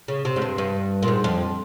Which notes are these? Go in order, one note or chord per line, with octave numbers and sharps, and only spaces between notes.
C#3
C3
G#2
G2
G2
A#2
G#2
F2